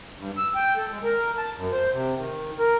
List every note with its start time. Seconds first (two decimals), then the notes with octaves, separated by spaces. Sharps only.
0.18 G2
0.37 E6
0.55 G5
0.77 A4
0.91 G#3
1.04 A#4
1.38 A5
1.56 F#2
1.73 C5
1.92 C3
2.16 D#3
2.59 A#4